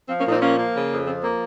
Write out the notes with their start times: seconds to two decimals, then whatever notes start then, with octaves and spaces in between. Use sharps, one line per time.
0.09 F3 C4
0.20 A#3 C#4
0.26 A#2
0.31 C4 D#4
0.41 F3 A#3 C#4
0.59 A#3
0.75 C#3
0.91 F2
1.07 F3 C4
1.23 A#3 C4